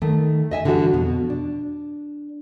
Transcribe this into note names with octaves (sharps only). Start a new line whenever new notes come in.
D#3 A3
D#5 E5 G#5
D3 E3 G3 F#4 A4
F2 B2
D4